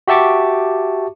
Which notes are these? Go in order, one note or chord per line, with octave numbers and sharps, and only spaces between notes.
F#4 G4 E5 A5 C#6 D6